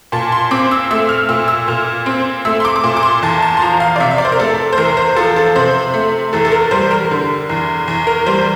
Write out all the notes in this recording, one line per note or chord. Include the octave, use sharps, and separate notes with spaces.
A#2 A5
C6
C4 D6
E6
A3 E6
F6
A#2 E6
E6
A#2 F6
C4
A3 E6
C6
D6
D6
A#2 C6
D6
C6
E2 A5
A5
C6
F3 A#5
F5
D5
C3 E5
E5
D5
C5
A#4
A3 A4
C5
E2 A#4
C5
F3 A4
A4
C3 C5
A3
E2 A4
A4
A#4
G3 C5
A#4
D3
E2
E2
A#4
G3 C5